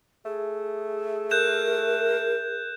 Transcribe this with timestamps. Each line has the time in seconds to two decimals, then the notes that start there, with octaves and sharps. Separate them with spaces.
0.25 A3 G#4
1.31 A#4 F#6 G6 E7